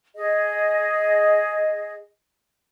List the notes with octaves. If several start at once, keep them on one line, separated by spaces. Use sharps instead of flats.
G#4 D#5